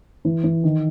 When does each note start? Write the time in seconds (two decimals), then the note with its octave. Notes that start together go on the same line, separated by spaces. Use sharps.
0.25 E3
0.44 E3
0.64 D#3